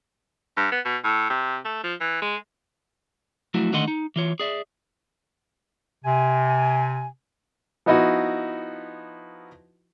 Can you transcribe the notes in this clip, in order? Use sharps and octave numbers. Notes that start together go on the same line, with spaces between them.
G2
B3
B2
A2
C3
A3
F3
E3
G#3
F3 F#3 A3 E4 F#4
D3 D#3 A3 D#5 F#5 C6
D#4
E3 F4 C#5
G#4 D5 E5
C3 G#5
F3 B3 D#4 E4 F#4